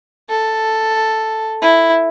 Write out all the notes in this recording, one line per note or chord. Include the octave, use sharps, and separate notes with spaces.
A4
E4